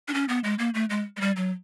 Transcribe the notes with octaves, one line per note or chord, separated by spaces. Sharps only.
D4
C#4
B3
G#3
A#3
A3
G#3
G#3
G3
F#3